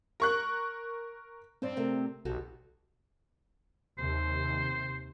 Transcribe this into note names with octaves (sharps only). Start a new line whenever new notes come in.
A#4 C#6 F#6
G2 C4 C5 D5
C3 A3 A#4
B1 F#4 G4 A4
D#2 C3 C5